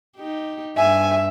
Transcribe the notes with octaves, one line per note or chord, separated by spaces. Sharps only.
D#4 G4
G2 E5 G#5